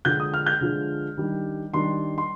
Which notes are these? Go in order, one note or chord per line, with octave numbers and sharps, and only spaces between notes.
D3 F3 G#3 D4 G6
D#6
F6
G6
D3 F3 G#3 D4
D#3 G3 D4
D#3 G3 D4 C6
C6